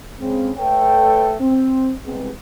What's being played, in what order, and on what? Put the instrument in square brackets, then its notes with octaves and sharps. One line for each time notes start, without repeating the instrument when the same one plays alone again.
[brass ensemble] C#3 G#3 C4
A3 A4 B4 C#5 G5
C4
C2 G#3 B3 C4